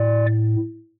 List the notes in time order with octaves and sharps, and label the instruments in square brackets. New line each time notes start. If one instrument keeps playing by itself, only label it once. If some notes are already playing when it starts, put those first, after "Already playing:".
Already playing: [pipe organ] A2 D5